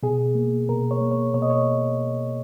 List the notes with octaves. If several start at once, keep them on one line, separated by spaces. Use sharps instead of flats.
B2 G#4
A#3
B2 A#4
C#5
A#3
C#5
B2 C#5
D#5
C#5